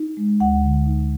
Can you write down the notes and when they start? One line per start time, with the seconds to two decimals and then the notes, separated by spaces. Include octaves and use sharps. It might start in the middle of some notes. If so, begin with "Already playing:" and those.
Already playing: D#4
0.17 G#3
0.40 D2 F#5
0.63 D3
0.86 D#4